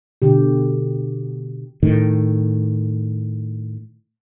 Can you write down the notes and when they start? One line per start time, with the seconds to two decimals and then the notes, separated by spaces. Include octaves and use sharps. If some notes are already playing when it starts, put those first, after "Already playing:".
0.22 B2 D3 G4
1.83 A2 D#3